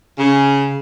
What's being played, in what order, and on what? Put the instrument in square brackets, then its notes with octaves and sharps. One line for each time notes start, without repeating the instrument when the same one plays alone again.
[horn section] C#3